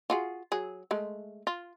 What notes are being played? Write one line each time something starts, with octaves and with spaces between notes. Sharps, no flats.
F4 F#4 G#4
F#3 G#4
G#3 A3
F4